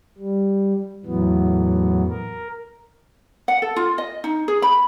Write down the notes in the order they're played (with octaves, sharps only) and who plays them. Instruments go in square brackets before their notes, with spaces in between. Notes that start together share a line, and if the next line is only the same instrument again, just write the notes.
[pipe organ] G3
E2 A2 E3 F#3 B3
A#4
[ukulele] F#5
A4
F4
D#5
D#4
G#4
B5